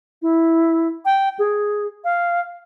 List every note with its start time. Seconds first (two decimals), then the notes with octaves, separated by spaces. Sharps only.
0.22 E4
1.05 G5
1.39 G#4
2.04 F5